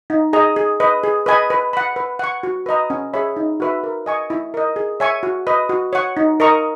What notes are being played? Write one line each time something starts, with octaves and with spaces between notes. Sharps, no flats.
D#4
G#4 D#5 A#5
G#4
B4 D#5
G#4
B4 D#5 G#5 B5
B4
F#5 B5
B4
F#5 C#6
F#4
B4 D#5 A#5
C#4
G#4 C#5 E5 B5
D#4
F#4 B4 E5
A#4
D#5 G#5 C#6
E4
A#4 D#5
G#4
C#5 E5 G#5 C#6
F#4
B4 D#5
F#4
C#5 F#5 C#6
D#4
A#4 D#5 A#5 C#6